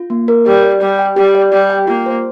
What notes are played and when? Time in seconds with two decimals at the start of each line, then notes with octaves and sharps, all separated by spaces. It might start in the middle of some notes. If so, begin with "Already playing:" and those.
Already playing: F4
0.10 A#3
0.28 A#4
0.46 G3 G4
0.63 D5
0.81 G3 G4
0.99 G5
1.16 G3 G4
1.35 D5
1.52 G3 G4
1.70 G5
1.88 A#3 F4
2.06 C5